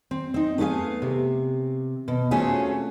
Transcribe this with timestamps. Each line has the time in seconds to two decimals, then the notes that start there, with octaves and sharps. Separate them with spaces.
0.11 C4
0.34 C4 D#4
0.58 A3 B3 E4 G#4 F5
1.02 C3
2.08 B2
2.31 A3 C4 C#4 F4 F#4 G#4